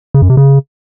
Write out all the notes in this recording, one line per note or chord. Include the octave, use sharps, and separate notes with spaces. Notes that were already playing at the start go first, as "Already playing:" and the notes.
C#3
F#2
C3
C#3